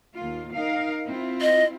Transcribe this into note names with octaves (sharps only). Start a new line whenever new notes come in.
D#2 A#3 F4
D#4 A#4 F5
C4 E4 F4
D#5